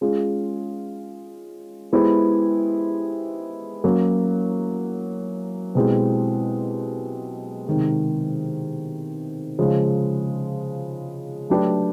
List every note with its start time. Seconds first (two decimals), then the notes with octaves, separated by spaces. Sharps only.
0.01 G#3 C#4 F4 G#4
1.93 G#3 B3 E4 G4 C5
3.84 F#3 A#3 C#4
5.75 B2 G#3 C4 E4 G4
7.67 C3 D#3 G#3
9.59 C#3 F3 G#3
11.50 F#3 A3 D4 G4 B4